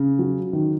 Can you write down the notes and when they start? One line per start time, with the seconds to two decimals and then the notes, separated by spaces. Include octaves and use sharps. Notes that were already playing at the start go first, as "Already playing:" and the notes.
Already playing: C#3
0.19 F#3
0.53 D#3